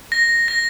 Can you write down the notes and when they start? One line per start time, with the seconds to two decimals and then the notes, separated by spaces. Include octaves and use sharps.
0.12 A#6
0.48 A#6